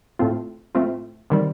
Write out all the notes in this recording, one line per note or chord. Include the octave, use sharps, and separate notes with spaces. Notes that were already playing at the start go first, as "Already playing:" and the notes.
A2 A3 C4 F4
A2 A3 C4 F4
C3 D#3 G3